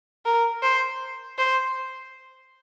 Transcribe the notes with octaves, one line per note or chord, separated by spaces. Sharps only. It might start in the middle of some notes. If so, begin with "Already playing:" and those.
A#4
C5
C5